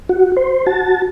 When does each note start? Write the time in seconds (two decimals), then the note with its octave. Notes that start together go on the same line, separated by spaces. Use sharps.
0.09 F#4
0.37 C5
0.67 F#4 A5